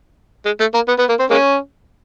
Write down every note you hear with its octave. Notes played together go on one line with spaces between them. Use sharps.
G#3
A3
A#3
B3
B3
A#3
C4
G#3 A#3 C#4